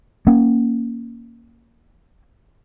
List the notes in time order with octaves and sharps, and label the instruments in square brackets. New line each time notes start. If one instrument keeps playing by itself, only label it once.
[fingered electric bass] A#3 C#4